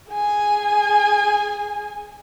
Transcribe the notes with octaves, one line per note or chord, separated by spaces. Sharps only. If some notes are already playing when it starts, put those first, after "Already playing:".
G#4 G#5